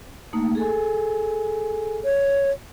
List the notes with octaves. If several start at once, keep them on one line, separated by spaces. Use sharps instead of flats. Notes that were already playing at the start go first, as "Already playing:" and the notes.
A3 A#3 D#4
G#4 A4 G#5
C#5